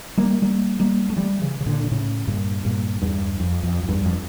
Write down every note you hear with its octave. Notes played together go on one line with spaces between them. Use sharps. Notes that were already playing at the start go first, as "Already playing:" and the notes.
G3 A#3
G3 A#3
G3 A#3
A3
E3 G3
C#3 E3
C#3
A#2 D3
D3
A2 C#3
G2 A#2
G2 A#2
E2 G2
F2
F2
F2
E2 G2
F2